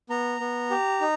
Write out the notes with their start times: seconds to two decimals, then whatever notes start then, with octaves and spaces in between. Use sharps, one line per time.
0.10 B3 A#5
0.40 B3
0.70 G4
1.01 D#4